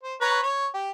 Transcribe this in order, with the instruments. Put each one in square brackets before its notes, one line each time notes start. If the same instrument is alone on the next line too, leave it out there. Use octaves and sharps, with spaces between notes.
[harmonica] C5
B4 C#5 A#5
C#5
G4